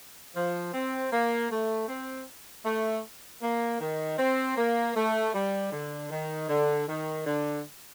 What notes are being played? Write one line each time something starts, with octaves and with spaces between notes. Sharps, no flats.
F3
C4
A#3
A3
C4
A3
A#3
D#3
C4
A#3
A3
G3
D3
D#3
D3
D#3
D3